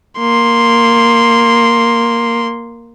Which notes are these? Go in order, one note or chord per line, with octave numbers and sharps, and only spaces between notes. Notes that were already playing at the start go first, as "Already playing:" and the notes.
A#3 C6